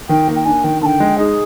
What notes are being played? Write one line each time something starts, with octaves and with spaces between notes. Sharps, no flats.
D#3 G5
A#3
G5
D4 G#5
D#3 G5
D3 G5 A5
G#3
D#4 G#4